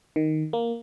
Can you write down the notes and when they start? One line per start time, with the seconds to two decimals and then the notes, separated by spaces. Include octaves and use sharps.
0.16 D#3
0.53 A#3